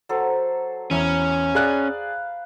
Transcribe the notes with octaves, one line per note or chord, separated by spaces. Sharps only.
F#3 A4 C5
E2 C#4 A#4 E5 B5
G#4 D5 F5 A5 B5 F#6